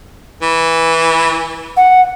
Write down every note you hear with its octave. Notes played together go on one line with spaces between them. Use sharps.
E3
F#5